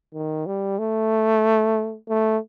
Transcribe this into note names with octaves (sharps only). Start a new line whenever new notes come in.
D#3
G3
A3
A3